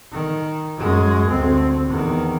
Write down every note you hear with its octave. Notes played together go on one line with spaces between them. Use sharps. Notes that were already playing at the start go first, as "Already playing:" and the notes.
D#3
F#2 G#3
D2 C4
E2 D#3